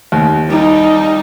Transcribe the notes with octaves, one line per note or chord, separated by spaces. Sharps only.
D#2
G3 D#4